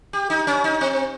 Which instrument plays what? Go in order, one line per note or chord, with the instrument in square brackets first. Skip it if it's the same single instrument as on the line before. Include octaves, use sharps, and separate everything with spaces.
[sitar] G4
D#4
C#4
D#4
C4